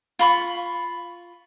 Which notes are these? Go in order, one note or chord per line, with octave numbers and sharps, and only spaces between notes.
F4 B5 C#6